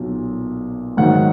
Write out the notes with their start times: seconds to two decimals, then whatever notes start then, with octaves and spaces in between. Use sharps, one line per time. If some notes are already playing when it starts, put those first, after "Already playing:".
Already playing: B1 A#2 F#3
0.97 G#2 D#3 F#3 F#5